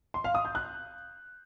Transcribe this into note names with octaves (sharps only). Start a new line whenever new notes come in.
C6
F5
D#6
G6
F#6